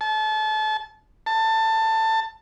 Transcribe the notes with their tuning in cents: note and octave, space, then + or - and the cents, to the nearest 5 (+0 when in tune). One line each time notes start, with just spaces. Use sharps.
A5 -30
A5 +20